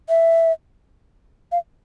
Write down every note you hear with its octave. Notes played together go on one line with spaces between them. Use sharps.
E5
F5